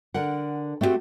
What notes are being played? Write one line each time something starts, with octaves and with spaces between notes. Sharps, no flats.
D3 A#4 F#5
A3 C4 D4 F#4 G4